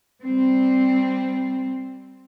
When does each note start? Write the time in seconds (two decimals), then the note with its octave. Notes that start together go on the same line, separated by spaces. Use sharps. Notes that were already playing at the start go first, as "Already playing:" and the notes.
0.23 G3 C4